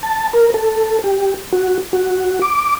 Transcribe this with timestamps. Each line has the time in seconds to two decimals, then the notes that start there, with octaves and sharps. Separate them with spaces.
0.03 A5
0.33 A#4
0.54 A4
1.04 G4
1.53 F#4
1.93 F#4
2.42 D6